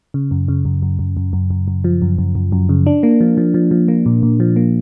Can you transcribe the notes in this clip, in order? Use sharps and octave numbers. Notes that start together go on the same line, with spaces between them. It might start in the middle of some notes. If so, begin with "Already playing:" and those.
C#3
F#2
C#3
F#2
F#2
F#2
F#2
F#2
F#2
F#2
F3
F#2
F#2
F#2
F#2
C#3
D4
A#3
F3
F3
F3
F3
A#3
A#2
A#2
F3
A#3